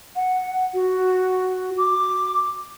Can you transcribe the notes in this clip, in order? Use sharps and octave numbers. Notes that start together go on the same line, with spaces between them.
F#5
F#4
D6